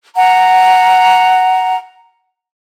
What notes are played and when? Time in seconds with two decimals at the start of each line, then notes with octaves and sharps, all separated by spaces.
0.17 F#5 A#5